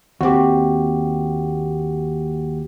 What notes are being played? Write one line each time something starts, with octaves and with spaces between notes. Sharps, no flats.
D#2 C4 F#4 G4